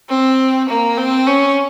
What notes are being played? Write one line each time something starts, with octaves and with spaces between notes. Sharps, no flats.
C4
A#3
C4
C#4